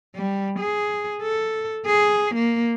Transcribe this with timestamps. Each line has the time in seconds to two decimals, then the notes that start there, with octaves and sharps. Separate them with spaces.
0.15 G3
0.59 G#4
1.22 A4
1.86 G#4
2.35 A#3